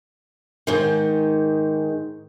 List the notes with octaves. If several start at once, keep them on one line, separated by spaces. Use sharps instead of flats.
G#2 D#3